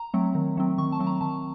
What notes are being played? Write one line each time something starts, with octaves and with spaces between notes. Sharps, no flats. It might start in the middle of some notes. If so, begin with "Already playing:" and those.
Already playing: A#5
F#3 A3 C4
D#3
F#3 A3 C4
D#3 C#6
A5
F#3 A3 C4
A#5
D#3 A5